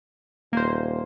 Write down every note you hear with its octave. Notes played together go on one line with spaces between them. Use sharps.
D#1 A#3 C5